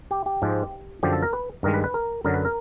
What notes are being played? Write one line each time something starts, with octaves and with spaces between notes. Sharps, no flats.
G4
G4
G#2 F3 G#3
F#2 D3 F3 G4
A4
A#4
B4
G2 D#3 G#3 A#4
B4
B4
A#4
F#2 D3 F#3 A#4
B4
A#4